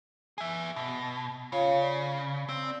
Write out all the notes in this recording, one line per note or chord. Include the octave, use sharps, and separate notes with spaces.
G#4 E5
B2
C#3 F4 C#5 F5
D5
C4